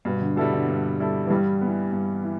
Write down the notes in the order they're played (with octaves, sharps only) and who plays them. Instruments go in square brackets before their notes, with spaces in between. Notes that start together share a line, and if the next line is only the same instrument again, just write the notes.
[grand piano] G2 [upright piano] B2
[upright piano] D3
[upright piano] B2 [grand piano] G3 E4 A4
[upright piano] D3
[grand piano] G2
G3 E4 A4
[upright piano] E3
[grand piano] G2 [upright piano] G3
[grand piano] B3
E3
G2
E3